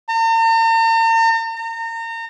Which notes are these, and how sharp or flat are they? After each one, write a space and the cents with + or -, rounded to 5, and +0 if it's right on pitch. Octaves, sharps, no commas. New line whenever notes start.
A#5 -45
A#5 -35